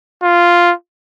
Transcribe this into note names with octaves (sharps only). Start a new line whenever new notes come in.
F4